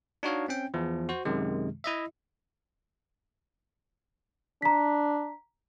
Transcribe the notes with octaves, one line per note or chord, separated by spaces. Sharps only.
D4 D#4 F#4 C#5 D#5 F5
C4 C#4 G5
E2 F3
F#4 C5
F#2 C3 D#3 G#3
E4 D#5 E5
D4 A#5 B6